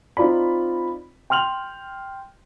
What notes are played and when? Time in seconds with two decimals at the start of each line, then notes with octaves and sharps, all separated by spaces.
0.17 C4 D#4 F4 D5 B5
1.30 G5 C6 F6 F7 F#7